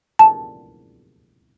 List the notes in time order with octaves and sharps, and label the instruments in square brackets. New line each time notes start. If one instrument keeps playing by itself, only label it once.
[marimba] A5